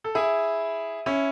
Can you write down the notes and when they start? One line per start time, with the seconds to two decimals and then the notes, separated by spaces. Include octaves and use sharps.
0.04 A4
0.15 E4 G#4
1.06 C#4 E4